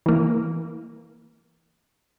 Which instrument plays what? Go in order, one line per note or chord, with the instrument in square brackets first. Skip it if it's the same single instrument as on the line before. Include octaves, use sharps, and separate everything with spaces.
[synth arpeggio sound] E3 A#3